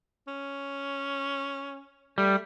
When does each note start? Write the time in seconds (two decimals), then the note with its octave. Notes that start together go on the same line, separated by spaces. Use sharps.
0.28 C#4
2.18 G3 A3